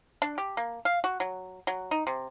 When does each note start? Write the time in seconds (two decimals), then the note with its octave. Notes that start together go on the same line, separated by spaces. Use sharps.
0.22 D4
0.38 G4
0.57 A#3
0.85 F5
1.04 F#4
1.20 F#3
1.67 F#3
1.91 D#4
2.07 C3